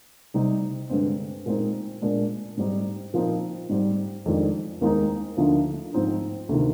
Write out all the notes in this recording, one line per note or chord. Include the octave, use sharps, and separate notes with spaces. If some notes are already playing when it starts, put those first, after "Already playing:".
C3 G3 C4 D#4
G2 D3 G#3 C4
A#2 G#3 C4 D#4
A#2 G#3 D4
G#2 G3 C4 D#4
A#2 F3 C4 D#4
G#2 G3 C4
F2 D#3 G#3 D4
D#2 D#3 G#3 C4 D#4
D2 D3 F3 A#3 D#4
G#2 F3 C4 D#4
D2 C3 D#3